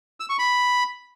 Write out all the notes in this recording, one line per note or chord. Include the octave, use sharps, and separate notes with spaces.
E6
C#6
B5